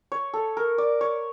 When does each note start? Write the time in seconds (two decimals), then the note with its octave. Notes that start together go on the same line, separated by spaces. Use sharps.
0.12 C#5
0.34 A4
0.57 A#4
0.78 D5
1.01 C#5